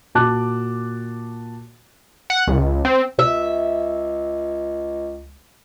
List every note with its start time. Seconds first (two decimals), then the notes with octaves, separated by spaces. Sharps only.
0.15 A#2 F#4 A5 D6 F#6
2.30 F#5
2.47 C#2
2.85 C4
3.19 C#2 E5